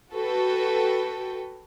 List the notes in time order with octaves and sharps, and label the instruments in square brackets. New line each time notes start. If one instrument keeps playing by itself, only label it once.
[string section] F#4 A4 B4 G5